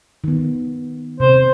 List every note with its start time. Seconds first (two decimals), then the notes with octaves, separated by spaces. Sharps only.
0.24 D#3 B3
1.20 C3 C5